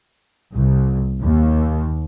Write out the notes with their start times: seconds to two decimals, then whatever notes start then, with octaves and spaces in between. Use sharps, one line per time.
0.55 C2
1.22 D#2